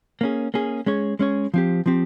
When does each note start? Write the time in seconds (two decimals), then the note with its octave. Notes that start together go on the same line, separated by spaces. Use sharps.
0.21 A#3 C#4 G#4
0.54 A#3 C#4 G#4
0.86 G#3 C#4 G#4 C#5
1.19 G#3 C#4 G#4 C#5
1.54 F3 C4 G4
1.86 F3 C4 G4